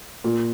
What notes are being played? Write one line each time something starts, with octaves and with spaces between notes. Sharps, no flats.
A#2